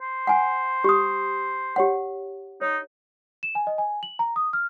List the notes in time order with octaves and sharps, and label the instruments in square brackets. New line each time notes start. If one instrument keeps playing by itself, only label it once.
[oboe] C5
[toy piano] F#5 G#5
G4 D#6
G4 C#5 F#5
[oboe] D#4 [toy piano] C#5
[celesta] E7
G#5
D#5
G#5
F#7
A#5
D#6
F6